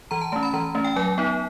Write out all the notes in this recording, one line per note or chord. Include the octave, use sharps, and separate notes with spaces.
E3 A#5
A5
A3 C#4 A5
B5
E3 A#5
A3 C#4
G5
F#3 G#5
B3 D#4